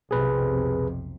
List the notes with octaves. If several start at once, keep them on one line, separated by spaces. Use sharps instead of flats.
B1 F2 C3 G#4 B4